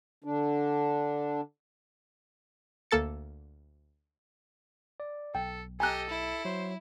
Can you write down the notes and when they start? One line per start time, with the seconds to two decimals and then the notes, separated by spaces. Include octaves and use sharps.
0.24 D3 D4
2.91 D2 A#3 A4 A6 C#7
5.00 D5
5.35 B1 A4 G5
5.80 G4 A4 D#5 G#5 A#5 F#6
6.09 E4
6.45 F#3 C5